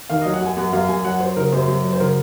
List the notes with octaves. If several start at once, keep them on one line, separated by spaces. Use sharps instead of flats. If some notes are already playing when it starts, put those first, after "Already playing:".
D#3 F5
F#3 D#5
F#5
F#2 G#5
F#2 F#5
F#2 F5
F#2 G#5
F#3 F#5
F#3 C5
C#3 A#4
F#2 C5
F#2
F#3
C5
C#3 A#4